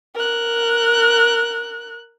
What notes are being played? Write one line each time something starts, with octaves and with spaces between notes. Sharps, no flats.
A#4 F#6